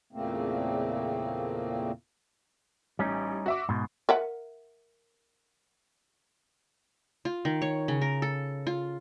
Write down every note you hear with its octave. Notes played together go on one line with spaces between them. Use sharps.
E2 A#2 C#3 A3 A#3 C4
A1 G3 C#4 D#4
F#4 E5 D6
G#2 B2 C6
A#4 E5 F#5
F4
D#3
C#5
C#3
A#4
A4
F4